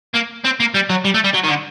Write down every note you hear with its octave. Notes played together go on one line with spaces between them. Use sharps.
A#3
C4
A#3
G3
F#3
G3
A3
G3
F#3
D#3
D3